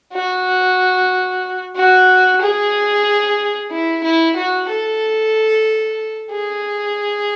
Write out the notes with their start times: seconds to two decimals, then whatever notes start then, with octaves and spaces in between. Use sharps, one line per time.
0.13 F#4
1.76 F#4
2.41 G#4
3.71 E4
4.03 E4
4.36 F#4
4.69 A4
6.31 G#4